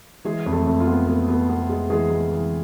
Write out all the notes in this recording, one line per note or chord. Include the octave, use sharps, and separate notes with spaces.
E3 G#3 G#4
F2
A3 A4
F2
F4
B3
B3
B3
B3
G#3
E3 G#3 G#4
G#3
E3